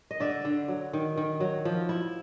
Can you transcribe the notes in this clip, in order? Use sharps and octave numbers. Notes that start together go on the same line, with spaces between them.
D#5
D3 D5 E5
D3
F#3
D#3
D#3
F#3
F3
E4